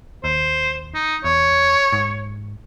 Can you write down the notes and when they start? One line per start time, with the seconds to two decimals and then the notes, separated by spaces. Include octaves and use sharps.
0.24 D#2 C5
0.95 D#4
1.24 E2 C#5
1.93 G#2